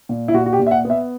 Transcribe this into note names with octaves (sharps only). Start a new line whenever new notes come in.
A#2
E4
A#2 F#4
F#4
G4
A#2
E5
F#5
B3
E5